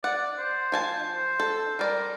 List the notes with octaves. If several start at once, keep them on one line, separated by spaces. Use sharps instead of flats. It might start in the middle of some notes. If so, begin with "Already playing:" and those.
D5 F#5
C5
F3 G#5 A5
C5
A4
G3 A#4 D5